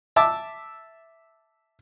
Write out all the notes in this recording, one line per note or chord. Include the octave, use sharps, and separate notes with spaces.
E5 A5 D6 E6